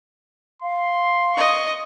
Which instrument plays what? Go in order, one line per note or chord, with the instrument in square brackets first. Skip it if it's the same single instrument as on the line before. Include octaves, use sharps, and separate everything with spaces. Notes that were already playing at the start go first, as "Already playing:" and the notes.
[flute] F5 [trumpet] C6
[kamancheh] D#5 C#6